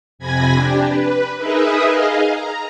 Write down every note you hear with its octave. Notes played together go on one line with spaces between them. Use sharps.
F2 C3 G#5 B5 G#6 A#6
D4 G4
B4
D#4 G#4 A#4 B4 D#5 E5
G#4 D#5 F5
A#5